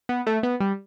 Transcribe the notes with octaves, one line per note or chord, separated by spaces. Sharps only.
B3
A3
B3
G3